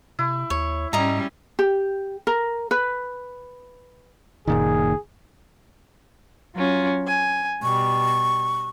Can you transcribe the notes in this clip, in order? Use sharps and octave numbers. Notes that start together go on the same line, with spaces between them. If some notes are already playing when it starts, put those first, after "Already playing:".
C3 E4
D#2 C#5
G#2 G3 C#4 D#5 A#5
G4
A#4
B4
F#1 A#2 D#3 G#4
F#3 C#4 F4
G#5
B2 G3 C#6